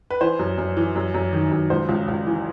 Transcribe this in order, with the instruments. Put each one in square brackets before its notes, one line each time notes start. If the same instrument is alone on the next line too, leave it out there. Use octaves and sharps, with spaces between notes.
[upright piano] B4
E3 C5
F#2
F#2
E3
F#2
F#2
D#3
F#2
C#2 C5
C#2
C#2
E3